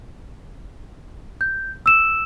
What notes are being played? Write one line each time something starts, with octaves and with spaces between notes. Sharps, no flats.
G6
E6 E7